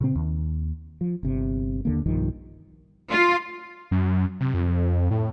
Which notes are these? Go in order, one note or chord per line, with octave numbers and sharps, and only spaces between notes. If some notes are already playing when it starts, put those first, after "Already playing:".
A#2 C#3 C4
D#2
F3
G1 C3
D#2 D3 A#3
B1 G2 D#3 F3
F4
F#2
C3
F2
A2